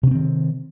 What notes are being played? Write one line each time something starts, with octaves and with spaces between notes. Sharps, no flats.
C3 D#3 C4 C#4